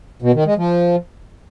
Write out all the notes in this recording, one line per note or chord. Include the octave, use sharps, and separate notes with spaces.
B2
D#3
G#3
F3